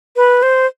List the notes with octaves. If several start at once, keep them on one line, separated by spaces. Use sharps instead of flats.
B4
C5